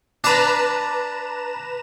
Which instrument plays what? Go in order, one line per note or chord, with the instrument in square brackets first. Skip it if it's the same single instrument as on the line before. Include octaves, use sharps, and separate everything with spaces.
[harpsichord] D4 [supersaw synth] B4 A#5 E7